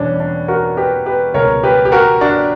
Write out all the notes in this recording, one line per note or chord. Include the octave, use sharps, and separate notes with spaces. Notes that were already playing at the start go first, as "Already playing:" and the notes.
Already playing: E2 B2 G3 C#4 D4
D4
F#4 A#4
G4 B4
G4 B4
C#2 B2 G3 A#4 C#5
G4 B4
G4
F#4 A#4
D4 F#4